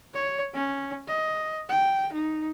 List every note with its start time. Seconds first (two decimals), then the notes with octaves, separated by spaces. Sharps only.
0.14 C#5
0.54 C#4
1.07 D#5
1.69 G5
2.12 D#4